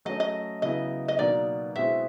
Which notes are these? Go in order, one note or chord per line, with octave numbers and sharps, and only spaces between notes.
F#3 A3 C#4 D#5
D#5
C#3 F#3 B3 E4 D#5
D#5
B2 F#3 A#3 D#4 D5
B2 G#3 C4 E4 E5